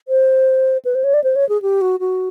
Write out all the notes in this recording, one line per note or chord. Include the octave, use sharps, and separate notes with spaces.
C5
B4
C5
C#5
D5
C5
C#5
G#4
G4
F#4
F#4